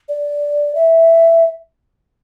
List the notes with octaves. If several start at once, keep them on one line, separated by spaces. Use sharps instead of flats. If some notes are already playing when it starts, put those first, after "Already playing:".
D5
E5